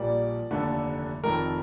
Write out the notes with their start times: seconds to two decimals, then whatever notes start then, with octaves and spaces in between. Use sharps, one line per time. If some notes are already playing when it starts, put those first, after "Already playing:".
Already playing: A#1 A#2 G3 A#3 D5
0.51 F1 D#2 D3 A3
1.24 F1 F2 D#3 A3 A#4